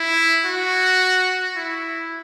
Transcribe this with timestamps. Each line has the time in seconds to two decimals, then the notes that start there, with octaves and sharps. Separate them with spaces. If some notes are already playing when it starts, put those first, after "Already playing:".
Already playing: E4
0.45 F#4
1.56 E4